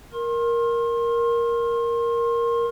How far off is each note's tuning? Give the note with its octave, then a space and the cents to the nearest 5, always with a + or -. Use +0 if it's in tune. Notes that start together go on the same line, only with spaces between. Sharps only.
A#4 +5 C6 +35